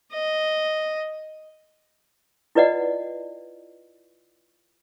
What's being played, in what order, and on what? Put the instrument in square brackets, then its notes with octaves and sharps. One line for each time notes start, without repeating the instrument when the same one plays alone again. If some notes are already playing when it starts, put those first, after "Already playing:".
[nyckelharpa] D#5
[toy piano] E4 F4 B4 D5 D#5 F#5